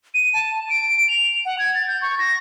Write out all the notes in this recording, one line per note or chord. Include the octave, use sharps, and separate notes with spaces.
D#7
A5
D7
F7
F#5
G#6
A6
G6
C#6
A#6